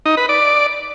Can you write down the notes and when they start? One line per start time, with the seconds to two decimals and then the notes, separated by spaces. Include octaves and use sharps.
0.06 D#4
0.17 B4
0.29 D5